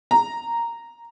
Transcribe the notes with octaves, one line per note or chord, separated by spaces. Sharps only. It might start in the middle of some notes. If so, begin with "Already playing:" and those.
A#5